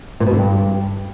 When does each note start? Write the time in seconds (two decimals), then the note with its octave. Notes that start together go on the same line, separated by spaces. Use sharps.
0.20 A#2
0.27 B2
0.33 D3
0.39 G2